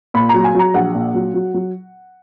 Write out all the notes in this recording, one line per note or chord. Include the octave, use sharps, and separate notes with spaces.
A#2 B5
A#5
F#3
G#5
F#3 A#5
A#1 F#5
A#2
F#3
F#3
F#3